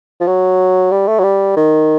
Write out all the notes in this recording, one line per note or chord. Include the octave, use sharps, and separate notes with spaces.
F3
F#3
G3
A3
F#3
G3
D#3